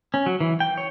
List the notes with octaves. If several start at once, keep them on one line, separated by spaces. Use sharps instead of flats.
C#4
F#3
E3
G5
C#5